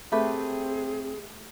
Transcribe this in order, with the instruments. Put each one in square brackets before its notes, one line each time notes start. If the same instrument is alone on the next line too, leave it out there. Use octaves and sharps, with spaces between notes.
[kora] A3 G4 B4 [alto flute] C4 [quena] G#4